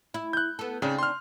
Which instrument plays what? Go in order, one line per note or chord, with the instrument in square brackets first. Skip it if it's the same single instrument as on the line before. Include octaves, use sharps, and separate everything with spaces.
[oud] E4
[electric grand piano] F#6 G6
[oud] B3 A4
[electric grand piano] C#3 [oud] C4 D4 D#4
[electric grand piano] C6 F6